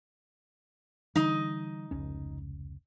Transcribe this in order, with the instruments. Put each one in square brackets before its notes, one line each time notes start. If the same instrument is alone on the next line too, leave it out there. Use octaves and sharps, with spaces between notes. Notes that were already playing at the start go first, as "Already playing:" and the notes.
[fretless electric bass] D3 E3 G3 [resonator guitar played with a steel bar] D#4 D#5
[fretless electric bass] F1 C#2 C#4